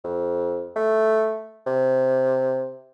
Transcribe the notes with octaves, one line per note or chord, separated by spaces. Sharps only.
F2
A3
C3